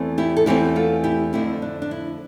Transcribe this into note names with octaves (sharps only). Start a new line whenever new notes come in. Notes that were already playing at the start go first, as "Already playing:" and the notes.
Already playing: E2 E3 A3 C4
E4 G4
A4
E2 E3 A3 C4 E4 G4
F4 A4
E4 G4
F2 D3 A3 C4 E4
D4
D4
E4